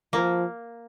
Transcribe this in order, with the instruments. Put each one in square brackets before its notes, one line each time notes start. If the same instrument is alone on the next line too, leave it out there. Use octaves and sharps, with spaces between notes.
[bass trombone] F3 [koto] A#3